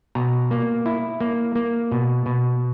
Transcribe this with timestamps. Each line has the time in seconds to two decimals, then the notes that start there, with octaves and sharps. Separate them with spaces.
0.15 B2 A#5
0.51 A#3
0.86 E4
1.21 A#3
1.55 A#3
1.92 B2
2.26 B2